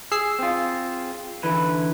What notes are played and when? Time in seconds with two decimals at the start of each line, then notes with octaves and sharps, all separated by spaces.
0.12 G#4 E6 C7
0.39 C4 F4
1.43 D3 E3 B4